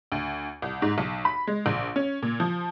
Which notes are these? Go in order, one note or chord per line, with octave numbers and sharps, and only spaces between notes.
D2
C2
G#2
B1
B5
G#3
A#1
C#4
A#2
F3